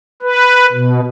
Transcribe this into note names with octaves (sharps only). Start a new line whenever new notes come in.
B4
B2